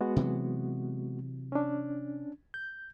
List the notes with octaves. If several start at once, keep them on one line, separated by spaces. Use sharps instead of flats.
G#3 B3 F#4
C3 E3 F#3
C#4 D4
G6